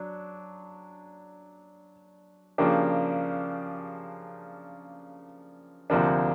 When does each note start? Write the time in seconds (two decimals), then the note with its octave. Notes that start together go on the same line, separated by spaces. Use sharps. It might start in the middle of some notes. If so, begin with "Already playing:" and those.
Already playing: F#3 D4
2.58 C#3 F3 A#3 D4 G4
5.90 D2 C3 F3 A#3 D4